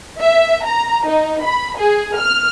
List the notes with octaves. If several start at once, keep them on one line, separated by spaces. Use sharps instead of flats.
E5
A#5
D#4
B5
G#4
F6